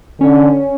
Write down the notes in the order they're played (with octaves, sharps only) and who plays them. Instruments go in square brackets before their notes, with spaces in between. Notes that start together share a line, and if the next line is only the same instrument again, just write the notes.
[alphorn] D3 [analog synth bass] C#4